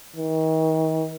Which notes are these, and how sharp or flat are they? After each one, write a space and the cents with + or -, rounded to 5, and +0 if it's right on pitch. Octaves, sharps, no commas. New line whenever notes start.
D#3 +40